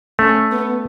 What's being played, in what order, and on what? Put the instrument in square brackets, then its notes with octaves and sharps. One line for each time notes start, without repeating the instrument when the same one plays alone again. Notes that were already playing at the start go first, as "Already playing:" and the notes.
[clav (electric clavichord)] A3 [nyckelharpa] C#4
[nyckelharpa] B3